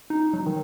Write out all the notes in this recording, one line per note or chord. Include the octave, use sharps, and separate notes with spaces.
D#4
F#3
D#3